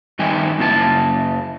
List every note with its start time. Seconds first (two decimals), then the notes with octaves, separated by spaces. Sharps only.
0.19 G2 D#3 G3 D#5 G5 G#5
0.59 F#2 C#3 A#3 E4 F4 A5